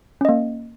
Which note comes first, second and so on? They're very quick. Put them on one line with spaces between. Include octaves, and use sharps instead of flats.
C#4 D#5 A#3